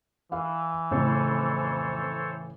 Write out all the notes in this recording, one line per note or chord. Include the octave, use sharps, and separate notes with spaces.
E3 F5
F2 A2 C#3 A4 C5 C#5